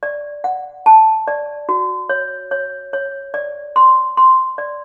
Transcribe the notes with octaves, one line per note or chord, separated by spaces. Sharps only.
D5
F#5
A5
D5
F#4
C#5
C#5
C#5
D5
C6
C6
D5